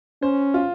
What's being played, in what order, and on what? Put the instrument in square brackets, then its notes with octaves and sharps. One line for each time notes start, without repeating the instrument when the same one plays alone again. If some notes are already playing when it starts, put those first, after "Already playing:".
[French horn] C#4 [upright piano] C5
[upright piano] F4